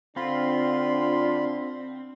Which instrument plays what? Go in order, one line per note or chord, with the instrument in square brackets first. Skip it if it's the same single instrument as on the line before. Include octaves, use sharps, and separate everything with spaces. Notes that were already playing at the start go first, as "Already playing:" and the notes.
[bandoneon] D3 B5 C6 [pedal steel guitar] C4 [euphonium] D4 [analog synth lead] F4